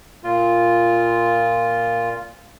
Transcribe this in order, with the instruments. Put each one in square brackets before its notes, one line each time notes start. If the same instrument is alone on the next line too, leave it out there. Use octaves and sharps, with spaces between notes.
[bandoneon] A#2 F4